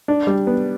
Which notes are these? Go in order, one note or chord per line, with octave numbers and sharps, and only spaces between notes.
D4
G3
B3